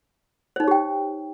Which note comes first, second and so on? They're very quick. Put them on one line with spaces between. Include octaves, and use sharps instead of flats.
C5 D#4 C#5 G4 G5